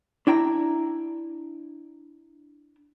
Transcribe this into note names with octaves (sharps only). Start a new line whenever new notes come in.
D4 E4 G5 A#5